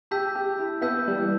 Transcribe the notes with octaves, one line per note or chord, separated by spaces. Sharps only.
G4 A5 E6 G6 B6
G4
E4
B3 A5 E6 G6 B6
G3
E3